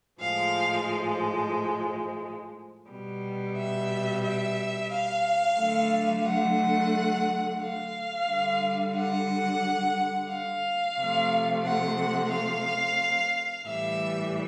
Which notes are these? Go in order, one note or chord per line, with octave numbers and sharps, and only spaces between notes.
A2 F3 G#3 F5
B2 G3
E5
E5
F5
D3 F#3 A3
F#5
F5
D3 G3
F#5
F5
C3 F3 A3
F#5
F5
A2 E3 G3 E5